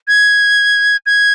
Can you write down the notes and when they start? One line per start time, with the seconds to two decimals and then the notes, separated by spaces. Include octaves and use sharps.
0.08 G#6
1.06 G#6